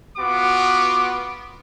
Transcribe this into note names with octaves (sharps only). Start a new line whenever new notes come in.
B3 F4 F#4 D6